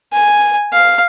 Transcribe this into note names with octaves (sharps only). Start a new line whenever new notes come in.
G#5
F5